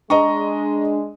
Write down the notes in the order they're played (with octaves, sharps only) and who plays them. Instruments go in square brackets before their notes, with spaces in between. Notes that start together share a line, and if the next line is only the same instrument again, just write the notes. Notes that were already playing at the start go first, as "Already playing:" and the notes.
[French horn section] G#3 [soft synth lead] D4 [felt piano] D#5 A#5 C#6